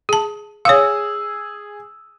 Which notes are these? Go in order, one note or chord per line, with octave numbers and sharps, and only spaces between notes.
G#4 A5
G#4 C#5 F5 D#6 E6